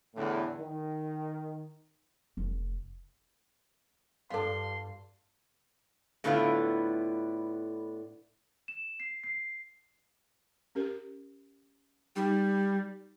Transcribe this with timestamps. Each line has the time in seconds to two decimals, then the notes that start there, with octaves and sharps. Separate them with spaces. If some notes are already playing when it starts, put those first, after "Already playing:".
0.15 E2 A2 D3
0.59 D#3
2.37 F1
4.30 G2 D4 F4 A4 D5 F5 C6
6.24 A2 D3 B3 E4 F4
8.68 E7
9.00 C7
9.24 C7
10.75 C#4 G4 A#4
12.16 G3 D#4 G5